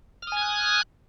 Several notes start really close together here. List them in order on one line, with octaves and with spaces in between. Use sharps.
F6 D#6 G#5 G#6 F#6